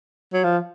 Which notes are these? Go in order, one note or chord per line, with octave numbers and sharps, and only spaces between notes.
F#3
F3